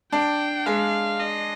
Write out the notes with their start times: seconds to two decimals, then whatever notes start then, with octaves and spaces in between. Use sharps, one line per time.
0.12 D4 G5
0.66 G#3 F5
1.20 D#5